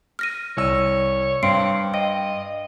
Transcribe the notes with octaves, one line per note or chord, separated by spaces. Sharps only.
F6 A#6 D#7
C2 C#5 E6
G2 C4 C6 C7 D7
D#5 G5